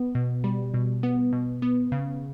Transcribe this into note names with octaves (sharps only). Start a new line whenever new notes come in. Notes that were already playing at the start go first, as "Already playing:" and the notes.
Already playing: B3
B2
G3
B2
B3
B2
B3
C#3